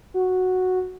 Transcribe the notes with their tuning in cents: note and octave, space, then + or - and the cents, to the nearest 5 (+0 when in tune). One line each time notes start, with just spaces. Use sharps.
F#4 -5